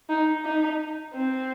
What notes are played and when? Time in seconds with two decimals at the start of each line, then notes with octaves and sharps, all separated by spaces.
0.09 D#4
0.45 D#4
1.13 C4